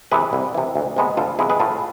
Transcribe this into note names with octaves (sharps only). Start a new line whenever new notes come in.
C3 E3 G#4 B4
C2
C3 E3
D2
C3 G#3 B3
D2 F4 A4
C3 G#3 B3 E4 G#4
G#4 B4
A2 F4 A4